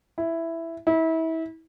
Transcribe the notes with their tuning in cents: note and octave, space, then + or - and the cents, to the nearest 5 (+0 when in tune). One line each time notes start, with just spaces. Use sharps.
E4 +5
E4 -30